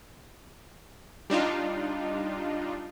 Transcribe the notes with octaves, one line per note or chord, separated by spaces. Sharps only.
G3 D4 D#4 F4